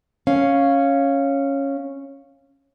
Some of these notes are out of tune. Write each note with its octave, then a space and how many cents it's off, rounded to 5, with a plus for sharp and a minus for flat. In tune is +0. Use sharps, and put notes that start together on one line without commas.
C#4 -5 F5 +0